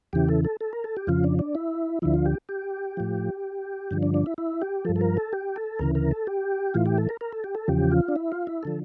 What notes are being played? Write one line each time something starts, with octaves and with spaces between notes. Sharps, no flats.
E2 C#3 E3 G4
A4
A4
A4
A#4
A4
G4
F2 C#3 F3 F4
D4
D4
E4
D2 D3 F3 E4
F4
G4
G4
A2 F3
G2 D3 F3
D4
D4
E4
E4
G4
G2 F3 A4
A4
A#4
A4
G4
A4
D2 C#3 E3 A#4
A#4
A4
G4
A2 E3 F4
G4
A4
A#4
A#4
A4
G4
A4
E2 C#3 F3 G4
F4
D4
E4
F4
E4
D3 F3 A4